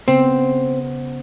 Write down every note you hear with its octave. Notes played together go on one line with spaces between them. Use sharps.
C#3 B3 C4 C5